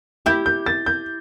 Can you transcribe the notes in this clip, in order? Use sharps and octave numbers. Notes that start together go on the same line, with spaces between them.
E4 G4 G6
G6
A6
G6